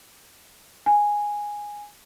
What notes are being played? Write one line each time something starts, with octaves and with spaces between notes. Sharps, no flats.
G#5